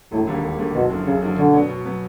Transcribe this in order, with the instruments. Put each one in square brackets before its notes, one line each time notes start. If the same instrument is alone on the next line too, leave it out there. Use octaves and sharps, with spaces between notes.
[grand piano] E1 [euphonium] A2
[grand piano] D#2 D3 G3 A#3
E1
D#2 D3 G3 A#3
[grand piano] F#1 [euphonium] B2
[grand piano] F#2 D3 F3
[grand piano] F#1 [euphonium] C#3
[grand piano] F#2 D3 F3
[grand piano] B2 [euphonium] D3
[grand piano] F#3 B3
B2
F#3 B3